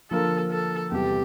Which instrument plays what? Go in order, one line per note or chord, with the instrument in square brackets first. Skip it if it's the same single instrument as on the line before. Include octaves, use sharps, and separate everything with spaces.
[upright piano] D3 F3 A#3 F4 A#4 [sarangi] A4
[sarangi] A4
[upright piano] E2 C3 G3 [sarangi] G4